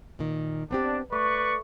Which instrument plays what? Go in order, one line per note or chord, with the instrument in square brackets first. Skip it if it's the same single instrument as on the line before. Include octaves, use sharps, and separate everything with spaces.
[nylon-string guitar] A#2 D#3
[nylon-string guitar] B3 C4 G4 [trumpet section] D4
[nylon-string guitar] A3 [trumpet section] B4 D5 C#6